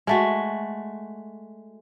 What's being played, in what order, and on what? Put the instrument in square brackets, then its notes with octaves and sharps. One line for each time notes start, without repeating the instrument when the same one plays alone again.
[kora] G#3 A3 F#4